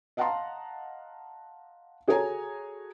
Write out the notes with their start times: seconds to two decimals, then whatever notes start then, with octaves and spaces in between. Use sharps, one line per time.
0.17 D#5 F5 F#5 A5 A#5 C6
2.07 F#4 G#4 A4 C#5 G#5 A#5